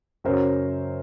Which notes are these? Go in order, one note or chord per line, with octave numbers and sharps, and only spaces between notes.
F#2 C#3 F#3 A#4 C5